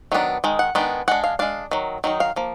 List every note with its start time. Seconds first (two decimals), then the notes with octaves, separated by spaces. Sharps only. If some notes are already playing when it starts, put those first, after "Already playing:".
0.12 D#3 F#3 B3 D4
0.44 D#3 G#3
0.59 F#5
0.75 D#3 G#3 B3 D4
1.08 G#3 D4 F#5
1.24 F5
1.39 G#3 D4 F5
1.71 D#3 F#3
2.04 D#3 F#3 D#4
2.20 F5
2.36 F3 A#3